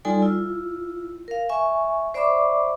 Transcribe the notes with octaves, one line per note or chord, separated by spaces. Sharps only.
G3 D#4 F4 A4 D5 G#5
E4 F4
A#4 F5
E5 G#5 C#6
C5 D5 E5 B5 C#6 D6